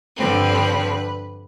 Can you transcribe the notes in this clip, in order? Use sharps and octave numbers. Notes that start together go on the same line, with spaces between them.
G2 D3 F3 C4 B4